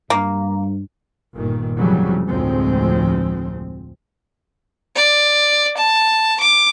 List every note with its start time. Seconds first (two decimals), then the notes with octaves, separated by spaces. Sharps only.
0.10 G2 A#3
1.34 G1 A#2 D#3
1.77 F1 F2 C#3 E3 F#3 G3
2.28 F1 D2 A2 F3 G#3 C4
4.96 D5
5.78 A5
6.41 D6